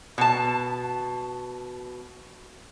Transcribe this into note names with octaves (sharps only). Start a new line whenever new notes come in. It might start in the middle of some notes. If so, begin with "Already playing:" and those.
B2 A5